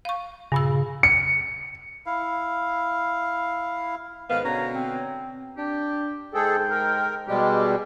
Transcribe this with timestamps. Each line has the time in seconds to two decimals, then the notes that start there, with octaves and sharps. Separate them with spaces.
0.05 F5 C#6
0.52 G2 A#2 C#3 E6
1.03 C#7
2.06 E4 F5
4.30 G#2 D#3 B3 F5
4.45 B2 D3 C#4 A#5
4.75 C4
5.57 D4 G4
6.34 G#2 G#3 G#4 A4 G5
6.70 A#4
7.28 B2 G3 G#3 G4